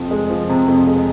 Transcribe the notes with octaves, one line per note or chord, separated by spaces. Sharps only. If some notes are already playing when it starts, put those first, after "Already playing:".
Already playing: F2 C3 F3
G#3
F3
C3
F2
G#3